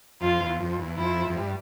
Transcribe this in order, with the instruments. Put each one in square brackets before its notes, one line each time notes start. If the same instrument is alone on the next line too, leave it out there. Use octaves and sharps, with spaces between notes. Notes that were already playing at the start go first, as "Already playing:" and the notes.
[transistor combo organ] F2 [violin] F4
[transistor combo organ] E2
F2
E2
[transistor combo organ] F2 [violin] E4
[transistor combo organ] F2
G2